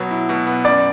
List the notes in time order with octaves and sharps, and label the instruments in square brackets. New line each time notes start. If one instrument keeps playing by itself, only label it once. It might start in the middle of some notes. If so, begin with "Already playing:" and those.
Already playing: [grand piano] B2 F#3 B3
E4
B2
B3
[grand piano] F#2 [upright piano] D5